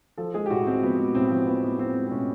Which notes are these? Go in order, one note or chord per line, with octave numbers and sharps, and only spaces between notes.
F3 A4
G#3 G#4
G4
A2 F#4
G#3 C4
F3 B3
G#3
A2 C4
F3
F3 B3
A2
F3 C4
G#3
C4
A2 C#4